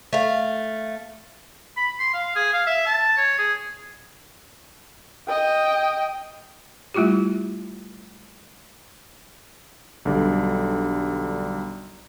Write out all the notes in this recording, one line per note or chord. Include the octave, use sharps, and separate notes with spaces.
A3 F5
B5
C6
F5
G#4
F5
E5
A5
C#5
G#4
D#5 G5
G3 A3 E4 F4 G4
B1 D3 G3